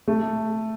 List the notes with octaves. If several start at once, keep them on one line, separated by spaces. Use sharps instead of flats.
A3